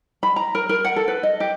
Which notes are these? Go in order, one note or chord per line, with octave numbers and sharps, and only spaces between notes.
B5
A#5
A#4
A#4
F#5
A4
B4
D#5
G4